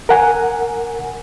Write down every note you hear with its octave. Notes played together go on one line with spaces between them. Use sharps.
A#4 F#5 G#5